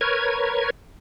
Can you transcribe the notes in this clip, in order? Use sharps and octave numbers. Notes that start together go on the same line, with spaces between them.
A#4 B4 C#5 G#6